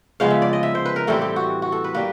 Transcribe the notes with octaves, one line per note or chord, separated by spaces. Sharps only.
C#3 F3 G#3 B3 F5
E5
D5
D#5
E5
C5
B4
A#4
A2 E3 G3 C4 A4
G4
F#4
F#4
A4
B4
G3 A#3 B4